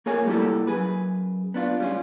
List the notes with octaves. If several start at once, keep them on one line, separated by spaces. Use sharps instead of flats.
A#3 F4 G#4 A#4 C#5 G#5
G3 A#3 E4 G4 A4
F#2 G#4 B4
B3 D4 F4
G3 C#4 F4